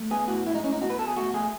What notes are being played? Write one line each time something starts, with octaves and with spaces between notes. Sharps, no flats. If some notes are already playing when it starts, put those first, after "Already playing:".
Already playing: A3
B3 G#4
A2 F#4
G#3 E4
D#4
A2 C#4
D#4
B2 F#4
B4
B2 A4
G#4
A3 F#4
A3 G#4